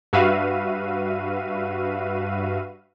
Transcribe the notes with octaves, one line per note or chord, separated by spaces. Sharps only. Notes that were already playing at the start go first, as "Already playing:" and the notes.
G2 F#4 B4 E5 F5 D#7